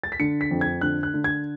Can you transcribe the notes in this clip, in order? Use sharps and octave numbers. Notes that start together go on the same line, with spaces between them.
A6
B6
D3 C#7
B6
F2
G#6
D3 F#6
F#6
D3
G#6